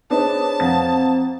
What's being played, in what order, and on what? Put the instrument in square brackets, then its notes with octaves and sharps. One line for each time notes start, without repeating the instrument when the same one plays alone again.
[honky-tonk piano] B3 D4 D#4 [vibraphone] G#4 C5 C#5 [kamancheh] A5
[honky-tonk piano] F2 A6 [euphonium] C4 [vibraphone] F5 F#5 A#5